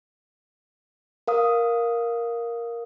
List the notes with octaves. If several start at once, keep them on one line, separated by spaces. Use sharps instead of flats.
A#4 F5 D#6